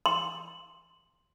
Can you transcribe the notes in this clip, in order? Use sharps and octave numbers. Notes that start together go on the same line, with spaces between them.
C6